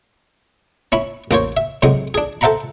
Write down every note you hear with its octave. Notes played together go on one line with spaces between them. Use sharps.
C#4 E4 B5
A1 A#3 C5 C#5
E5
A2 C3 F#3 G#3
D4 G#4
A4 C5 E5 F#5 A#5 B5